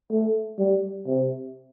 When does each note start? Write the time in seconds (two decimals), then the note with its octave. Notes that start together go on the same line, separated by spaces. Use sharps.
0.11 A3
0.59 G3
1.07 C3